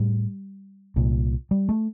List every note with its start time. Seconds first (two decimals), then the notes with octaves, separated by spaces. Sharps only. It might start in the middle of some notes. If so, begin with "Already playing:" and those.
Already playing: A2 G3
0.96 C2 A#2
1.51 G3
1.69 A3